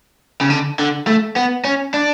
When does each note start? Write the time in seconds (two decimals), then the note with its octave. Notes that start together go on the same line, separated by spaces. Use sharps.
0.41 C#3
0.50 D3
0.79 D3
1.07 A3
1.36 B3
1.64 C#4
1.94 D4